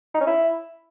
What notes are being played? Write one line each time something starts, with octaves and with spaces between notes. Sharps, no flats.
D#4
C#4
E4